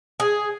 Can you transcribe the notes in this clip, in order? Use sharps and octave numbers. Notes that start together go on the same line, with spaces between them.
G#4